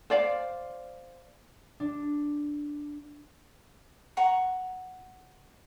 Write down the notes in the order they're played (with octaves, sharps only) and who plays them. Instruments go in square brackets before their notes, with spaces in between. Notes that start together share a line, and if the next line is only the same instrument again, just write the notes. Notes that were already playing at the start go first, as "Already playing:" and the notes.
[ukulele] C5 D5 F5
[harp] D4
[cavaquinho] F#5 A#5 C#6